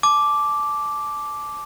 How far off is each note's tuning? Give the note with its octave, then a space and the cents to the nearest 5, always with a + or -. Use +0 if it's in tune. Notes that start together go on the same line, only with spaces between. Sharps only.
A5 -30 D6 +0